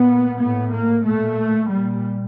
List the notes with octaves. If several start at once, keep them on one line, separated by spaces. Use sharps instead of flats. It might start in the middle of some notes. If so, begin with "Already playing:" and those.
Already playing: A#2 B3
A2 B3
A#3
A#2 A3
A#2 G3